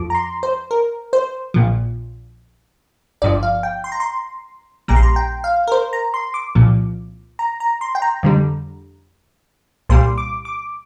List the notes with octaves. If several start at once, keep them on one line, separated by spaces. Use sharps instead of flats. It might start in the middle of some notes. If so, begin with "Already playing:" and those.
Already playing: F2 F3 D6
A#5
C6
C5
A#4
C5
A#1 A#2 F3
G1 G2 F3 D5
F5
G5
C6
A#5
C6
A#1 A#2 G3 A#5
C6
A#5
G5
F5
A#4
C5
A#5
C6
D6
C2 A#2 F3
A#5
A#5
C6
G5
A#5
F2 D3 G3
C2 A#2 G3 C6
D6
D6